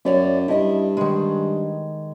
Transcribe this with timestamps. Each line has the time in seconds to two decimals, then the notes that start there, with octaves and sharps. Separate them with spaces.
0.05 F#2 C#5 D5 E5
0.48 G2 E4 D#5
0.97 D#3 G#3